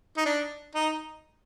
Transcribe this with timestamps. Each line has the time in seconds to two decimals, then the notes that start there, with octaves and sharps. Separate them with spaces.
0.17 D#4
0.26 D4
0.75 D#4